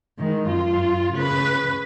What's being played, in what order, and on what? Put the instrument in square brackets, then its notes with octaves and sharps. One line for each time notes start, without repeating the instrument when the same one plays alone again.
[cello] D#3 G#3
F#2 F4
C#3 B4